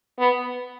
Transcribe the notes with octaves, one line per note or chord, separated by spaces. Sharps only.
B3